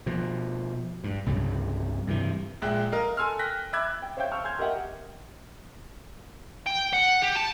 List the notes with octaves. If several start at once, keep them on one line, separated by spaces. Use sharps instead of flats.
B2 F3
G2
C2 G2 C#3 F#3
G2 C3 D#3 E3
A#1 G#3 E5 G5 F#6
A#4 D#5 F5
A4 G#5 C6 E6 F6
G5 F#6 A#6 B6
E5 B5 D6 E6 F#6 G#6
G5
C5 C#5 E5 F5 G5 G6
A5 C#6 E6 F6
G#5 C6 F6 G6 G#6
G4 A#4 D#5 E5 F#5 G5
G5
F#5
G4
A5